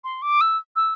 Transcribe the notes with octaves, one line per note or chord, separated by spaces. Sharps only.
C6
D6
E6
E6